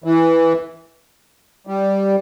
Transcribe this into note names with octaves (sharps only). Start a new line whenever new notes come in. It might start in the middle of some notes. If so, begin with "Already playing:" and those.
E3
G3